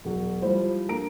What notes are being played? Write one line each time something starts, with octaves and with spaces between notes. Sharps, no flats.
E1 F#3
F3 G3 E4 C5
A#3 D4 A#5 D7